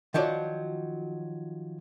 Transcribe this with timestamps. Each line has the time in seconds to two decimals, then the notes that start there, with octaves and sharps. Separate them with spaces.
0.14 D#3 F3 F#3 D5